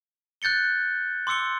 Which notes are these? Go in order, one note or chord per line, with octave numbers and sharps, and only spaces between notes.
F#6 G6 A6 C#7 G7
C6 D6 E6 C#7 G7